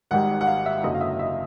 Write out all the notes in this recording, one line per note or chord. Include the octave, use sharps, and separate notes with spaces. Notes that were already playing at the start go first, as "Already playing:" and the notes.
G#1 G#2 D#3 G3 F#5
F#5
F5
E5
F#1 F#2 D3 F#3 D#5
F5
E5
E5